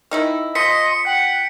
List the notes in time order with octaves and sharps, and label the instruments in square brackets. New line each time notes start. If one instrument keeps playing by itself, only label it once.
[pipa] D#3 D#4 E4
[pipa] F3 [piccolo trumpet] D#5 [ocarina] C6 [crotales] B6 C#7
[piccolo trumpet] F#5 [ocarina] G5